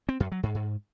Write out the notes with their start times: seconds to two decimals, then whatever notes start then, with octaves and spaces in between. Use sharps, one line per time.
0.09 C4
0.20 F#2
0.32 F#3
0.43 G#2
0.55 G#2